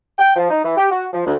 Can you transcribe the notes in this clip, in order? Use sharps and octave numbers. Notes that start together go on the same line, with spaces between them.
G5
F3
D#4
E3
G4
F#4
F3
D2